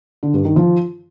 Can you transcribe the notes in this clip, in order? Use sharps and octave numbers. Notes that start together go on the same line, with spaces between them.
D3
G2
D#3
F3